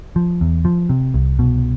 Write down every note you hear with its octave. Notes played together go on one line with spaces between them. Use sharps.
F3
E2
F3
C3
C2
B2